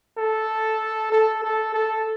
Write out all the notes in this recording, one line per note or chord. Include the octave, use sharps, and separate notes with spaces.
A4
A4
A4
A4